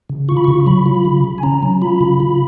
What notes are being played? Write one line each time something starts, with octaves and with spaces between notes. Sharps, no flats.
C#3
F4 C#6
B5
C#3 C#6
F#3 B5
F4
C#3
C#3
G#5
C#4 A#5
F#3
F4 B5
C#3
F4